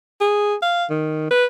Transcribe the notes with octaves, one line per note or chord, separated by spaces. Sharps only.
G#4
F5
D#3
B4